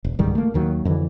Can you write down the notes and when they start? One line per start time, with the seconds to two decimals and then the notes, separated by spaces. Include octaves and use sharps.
0.05 E1
0.19 C#2 G#2 D#3 G3
0.35 A3 A#3
0.54 D#2 D#3 F#3 A#3
0.85 F2 D3 E3